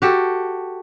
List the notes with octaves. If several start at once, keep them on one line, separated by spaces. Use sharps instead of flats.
F#4 G4 A4